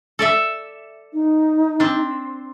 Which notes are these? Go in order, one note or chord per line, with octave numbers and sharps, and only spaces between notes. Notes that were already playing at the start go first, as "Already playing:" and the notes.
A4 D5 E5
D#4
C4 D4